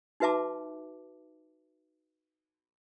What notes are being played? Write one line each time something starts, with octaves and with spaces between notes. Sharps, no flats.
D#4 F#4 B4 E5 A5 D6